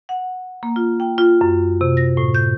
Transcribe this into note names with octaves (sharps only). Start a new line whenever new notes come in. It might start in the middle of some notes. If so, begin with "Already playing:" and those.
F#5
A#3
F4
G5
F4
F#2
C3
A#6
A2
G6